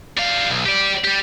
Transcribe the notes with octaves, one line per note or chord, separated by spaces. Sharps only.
G3 F5
B1
G4 D5
G3 G4